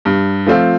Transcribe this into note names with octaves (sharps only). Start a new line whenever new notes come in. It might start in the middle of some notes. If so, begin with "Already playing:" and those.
G2
F3 A3 C4 F4